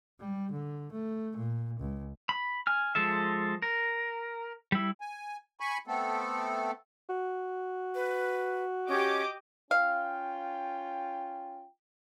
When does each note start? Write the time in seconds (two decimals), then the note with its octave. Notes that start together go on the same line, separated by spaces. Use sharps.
0.20 G3
0.52 D3
0.92 A3
1.37 A#2
1.80 C#2
2.29 B5
2.67 G#5 F6
2.95 F3 G#3 A4 E5
3.62 A#4
4.72 G3 E4
5.01 G#5
5.60 G#5 B5 C#6
5.87 A3 B3 C4 A4
7.09 F#4
7.95 B4
8.88 C#4 G4 D#5 D6
9.71 C#4 F4 F5 G5